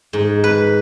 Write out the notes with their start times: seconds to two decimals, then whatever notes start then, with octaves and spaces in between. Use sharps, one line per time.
0.13 G#2
0.44 B4